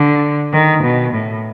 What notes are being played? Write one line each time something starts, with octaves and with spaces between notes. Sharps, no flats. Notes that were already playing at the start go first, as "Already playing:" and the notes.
Already playing: D3
D#3
B2
A2